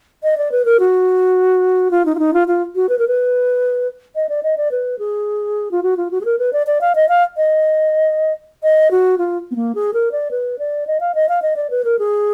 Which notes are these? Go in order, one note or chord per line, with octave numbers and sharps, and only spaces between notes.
D#5
D5
B4
A#4
F#4
F4
D#4
F4
D#4
F4
F4
F#4
B4
A#4
B4
D#5
D5
D#5
D5
B4
G#4
F4
F#4
F4
F#4
G#4
A#4
B4
D5
D5
F5
D#5
F5
D#5
D#5
F#4
F4
B3
A#3
G#4
A#4
D5
B4
D5
D#5
F5
D#5
F5
D#5
D5
B4
A#4
G#4